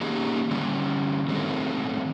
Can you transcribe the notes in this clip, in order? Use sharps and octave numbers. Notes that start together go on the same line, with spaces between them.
D#3 A#3 C#4 D#4 G4 G#4
D3 G3 C#4
D#3 F#3 G#3 A3 C4